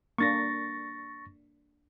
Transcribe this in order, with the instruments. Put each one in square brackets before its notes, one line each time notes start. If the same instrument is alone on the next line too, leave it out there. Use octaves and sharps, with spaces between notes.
[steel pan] A#3 D4 [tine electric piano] C#6 A6 A#6